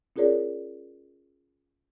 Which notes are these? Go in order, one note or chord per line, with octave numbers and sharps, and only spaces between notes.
C#4 F4 G#4 A#4 C#5 D5